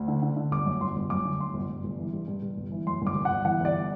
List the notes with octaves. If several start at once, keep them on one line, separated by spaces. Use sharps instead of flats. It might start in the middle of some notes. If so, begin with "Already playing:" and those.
Already playing: D2
D3
D3
D3
G1 D6
F#2
G1 C6
G1
F#2 D6
D3
F#2 C6
G1
G1
G1
E3
G2
G2
G2
G1
E3
F#2 C6
G1
D6
G1
F#5
G1
E3 F#5
G1 D5